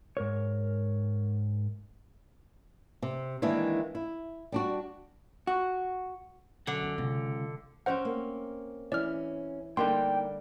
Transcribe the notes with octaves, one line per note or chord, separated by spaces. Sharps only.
G#2 A#4 C#5
C3
D#3 E3 G#3 A#3 D4 E4
E4
G3 D4 F#4
F#4
F#2 D3 F#5
C#4 D#4
C#2 C3 F#3
C4 C#4 A#4 C5 F#5
A#3
E3 C#4 D5 F6
D3 G3 A#3 D4 D#4 G5 C6